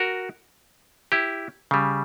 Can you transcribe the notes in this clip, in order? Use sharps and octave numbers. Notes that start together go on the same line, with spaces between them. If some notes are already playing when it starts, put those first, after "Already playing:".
Already playing: F#4 A#4
E4 G4
C#3 G3